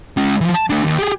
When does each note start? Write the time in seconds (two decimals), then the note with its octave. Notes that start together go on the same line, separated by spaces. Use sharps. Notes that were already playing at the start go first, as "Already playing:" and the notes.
0.17 G#3 C#4
0.41 E3 F3
0.54 A5
0.70 A3 D4
0.84 D#2
0.98 G4 G#4